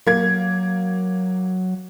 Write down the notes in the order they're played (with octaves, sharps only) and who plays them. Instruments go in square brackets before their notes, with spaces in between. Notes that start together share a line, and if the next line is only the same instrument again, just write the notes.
[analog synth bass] F#3 [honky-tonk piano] A#3 G#6